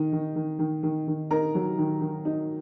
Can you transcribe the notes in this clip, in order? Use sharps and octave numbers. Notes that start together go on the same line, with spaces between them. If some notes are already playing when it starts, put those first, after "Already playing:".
Already playing: D#3 D#4
D#3
D#3
D#3
D#3
D#3
D#4 A#4 A#5
F#3
D#3
D#3
D#4